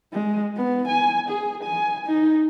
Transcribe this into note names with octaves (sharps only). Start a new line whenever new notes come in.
G#3
B3
G#5
G#4
G#5
D#4